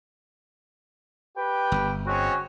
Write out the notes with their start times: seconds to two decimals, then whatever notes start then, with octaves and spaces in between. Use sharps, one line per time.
1.37 G4 B4 G5
1.72 G1
2.06 G#3 C4 C#4 F#4